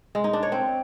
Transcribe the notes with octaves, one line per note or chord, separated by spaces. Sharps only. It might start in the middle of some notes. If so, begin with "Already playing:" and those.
G#3
D#4
D4
C#5
C4